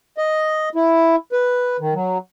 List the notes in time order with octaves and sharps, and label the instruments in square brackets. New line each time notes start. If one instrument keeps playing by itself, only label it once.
[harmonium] D#5
E4
B4
D#3
F#3